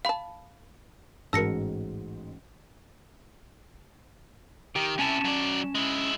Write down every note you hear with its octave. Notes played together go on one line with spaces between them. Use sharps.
F5 G5 A5 B5
A1 G#2 F#4 A#4 A5 E6 A#6 C#7
D#3 G4
C3 C#4 E4 G#5 A5
F#3 D5
G#3 E4